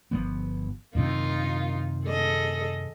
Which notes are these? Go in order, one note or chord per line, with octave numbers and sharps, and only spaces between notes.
G1 F3 B3
F#2 C3 D#3 D#4 F4
G#4 A4 D#5